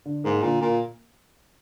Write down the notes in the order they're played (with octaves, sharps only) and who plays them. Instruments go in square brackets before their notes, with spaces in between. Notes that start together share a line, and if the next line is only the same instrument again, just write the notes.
[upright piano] D3
[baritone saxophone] G#2 [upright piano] A#3
[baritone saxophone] A#2 [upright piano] D3
[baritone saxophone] A#2 [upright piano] A#3